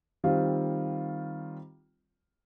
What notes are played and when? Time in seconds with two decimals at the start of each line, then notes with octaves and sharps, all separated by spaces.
0.24 D#3 G3 C4 F4